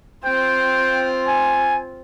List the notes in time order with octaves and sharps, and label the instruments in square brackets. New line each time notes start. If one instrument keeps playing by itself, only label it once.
[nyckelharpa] C4 F4 [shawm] G5
[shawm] G#5